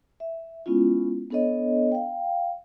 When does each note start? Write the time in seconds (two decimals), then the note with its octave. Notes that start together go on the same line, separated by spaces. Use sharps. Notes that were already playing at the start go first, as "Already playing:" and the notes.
0.20 E5
0.66 G#3 B3 C#4 E4 F4
1.31 B3 D4 A4 C#5 D#5
1.92 F5 G5